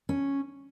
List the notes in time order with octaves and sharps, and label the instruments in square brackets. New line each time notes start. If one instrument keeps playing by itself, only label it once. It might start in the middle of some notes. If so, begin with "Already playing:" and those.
[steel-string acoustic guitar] C#4